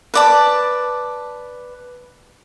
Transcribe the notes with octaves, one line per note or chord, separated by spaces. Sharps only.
B4 D5 A5